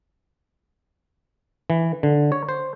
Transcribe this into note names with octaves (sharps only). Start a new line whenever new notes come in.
E3
D3
C#5
C5